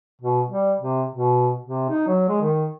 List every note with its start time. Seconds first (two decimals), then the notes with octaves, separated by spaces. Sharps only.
0.22 B2
0.48 G3
0.80 C3
1.15 B2
1.66 C3
1.90 D#4
2.07 F#3
2.29 G#3
2.41 D#3